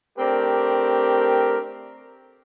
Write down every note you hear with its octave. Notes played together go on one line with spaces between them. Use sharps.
A3 C4 D4 G4 A#4